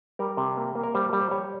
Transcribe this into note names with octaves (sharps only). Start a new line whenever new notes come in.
G3 A#4
C3
A#3
A#3
A#4
G3 C5
G3
C5
G3 C#5